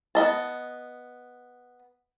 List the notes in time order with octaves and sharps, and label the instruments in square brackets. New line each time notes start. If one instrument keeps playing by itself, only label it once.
[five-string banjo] B3 D#5 A5